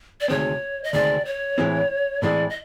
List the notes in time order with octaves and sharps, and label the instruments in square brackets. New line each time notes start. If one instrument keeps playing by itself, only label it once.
[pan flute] D5
[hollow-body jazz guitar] D2 C3 D#3 G#3 C4 [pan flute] C#5
[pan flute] D#5
[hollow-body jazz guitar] D2 C3 D#3 G#3 C4 [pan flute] D5
[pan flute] C#5
[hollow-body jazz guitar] A2 E3 G#3 C4 E4
[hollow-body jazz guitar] A2 E3 G#3 C4 E4 [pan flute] D5
[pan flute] D#5